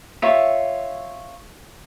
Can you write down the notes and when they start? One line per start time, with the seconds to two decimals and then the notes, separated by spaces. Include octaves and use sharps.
0.22 F4 C#5 E5